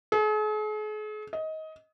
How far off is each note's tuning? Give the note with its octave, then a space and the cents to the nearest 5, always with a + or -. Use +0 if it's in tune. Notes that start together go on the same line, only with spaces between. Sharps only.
G#4 +45
D#5 +20